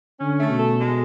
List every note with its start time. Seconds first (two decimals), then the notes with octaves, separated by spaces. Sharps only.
0.20 D3 C#4
0.40 A3
0.50 B2
0.59 A4
0.79 G#3